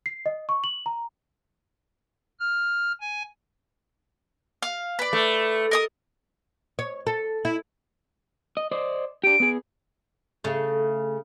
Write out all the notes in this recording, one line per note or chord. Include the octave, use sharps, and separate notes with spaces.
C7
D#5
C#6
F#7
A#5
F6
G#5
F5
B4 D5
A3
A#4 D#5 D#6
C#5
A4
E4
D#5
C5 D5 D#5
D4 G4 D7
B3 G#4
C#3 A3